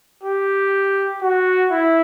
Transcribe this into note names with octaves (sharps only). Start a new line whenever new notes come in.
G4
F#4
E4